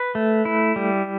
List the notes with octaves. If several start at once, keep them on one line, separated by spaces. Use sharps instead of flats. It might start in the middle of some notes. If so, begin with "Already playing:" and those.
Already playing: B4
A3
E4
G3